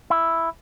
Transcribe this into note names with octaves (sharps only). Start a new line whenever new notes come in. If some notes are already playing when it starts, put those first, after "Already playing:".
E4